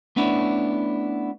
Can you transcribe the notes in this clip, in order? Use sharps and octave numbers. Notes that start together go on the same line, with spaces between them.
A3 B3 C#4 D4 E4